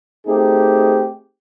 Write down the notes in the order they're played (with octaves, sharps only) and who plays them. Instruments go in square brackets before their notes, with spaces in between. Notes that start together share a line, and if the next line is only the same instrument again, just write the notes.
[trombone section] A3 C4 D#4 G4 G#4